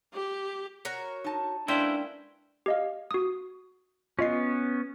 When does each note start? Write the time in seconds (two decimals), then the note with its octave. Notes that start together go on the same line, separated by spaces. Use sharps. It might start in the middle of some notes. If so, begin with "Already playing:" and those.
0.14 G4
0.85 F#4 A#4 C#5
1.24 D#4 A5
1.68 G#3 A#3 C#4 D4 E4 B4 C5 G5
2.66 G4 D#5 F5
3.11 F#4 D#6
4.19 B3 C#4 F4 D#5 C7